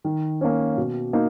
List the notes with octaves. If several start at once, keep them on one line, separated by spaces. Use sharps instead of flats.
D#3
A#3 C#4
B2
A#3 D#4